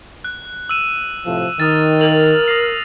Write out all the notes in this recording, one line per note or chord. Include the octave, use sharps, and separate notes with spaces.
F#6
E6 D#7 E7
A2 C3 F3
D#3 D#6 F6 A6
A#4 F7 F#7
D#6 A#6 C7